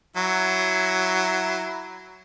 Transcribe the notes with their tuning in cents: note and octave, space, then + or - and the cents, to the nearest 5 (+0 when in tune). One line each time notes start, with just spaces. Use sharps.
F#3 +10 E4 +0